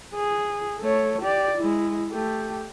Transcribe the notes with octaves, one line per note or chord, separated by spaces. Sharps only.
G#4
A3 C#5
G4 D5
G#3 E4
A3 G4